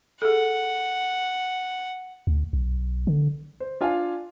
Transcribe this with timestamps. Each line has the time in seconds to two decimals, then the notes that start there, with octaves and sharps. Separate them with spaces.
0.22 G#4 A4 F#5
2.27 D2
2.53 B1
3.07 D3
3.60 C5
3.81 D4 F4 F5 G#5